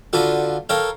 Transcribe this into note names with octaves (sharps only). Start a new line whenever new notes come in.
D3 F4 F#4 A4 B4
A4 A#4 C#5 F5 G5